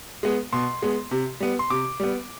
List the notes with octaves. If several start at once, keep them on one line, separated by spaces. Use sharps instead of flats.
G#3 B3
B2 C6
G#3 B3
C3
G3 B3
C6
C3 D6
G3 B3